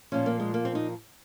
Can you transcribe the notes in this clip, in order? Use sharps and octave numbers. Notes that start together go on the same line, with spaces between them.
A#2 F3 C#4
A#3
G#3
A#3
C4
D#4